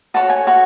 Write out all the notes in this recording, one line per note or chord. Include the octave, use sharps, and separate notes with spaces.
F#4 C#5 A5
G#5
F#4 C#5